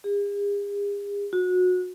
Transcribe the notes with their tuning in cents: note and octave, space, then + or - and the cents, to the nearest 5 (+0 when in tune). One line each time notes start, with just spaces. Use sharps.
G#4 -45
F#4 -25